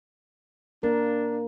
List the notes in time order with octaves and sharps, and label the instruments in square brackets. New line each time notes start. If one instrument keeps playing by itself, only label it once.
[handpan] A#3 A#4 [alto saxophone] D4